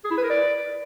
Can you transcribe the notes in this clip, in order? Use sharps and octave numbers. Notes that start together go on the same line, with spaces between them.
G#4
E4
B4
A#4
D5